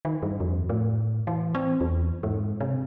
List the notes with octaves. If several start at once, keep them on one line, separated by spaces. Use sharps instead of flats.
D#3
G2
F2
A2
E3
C4
E2
G#2
C3